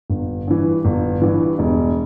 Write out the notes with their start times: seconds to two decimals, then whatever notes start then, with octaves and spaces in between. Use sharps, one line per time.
0.10 G1
0.48 G2 E3
0.85 G1
1.22 G2 E3
1.59 E1